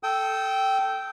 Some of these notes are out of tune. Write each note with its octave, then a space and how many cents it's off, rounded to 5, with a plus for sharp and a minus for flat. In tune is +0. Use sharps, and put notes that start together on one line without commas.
A4 +0 G5 -10 D#6 +45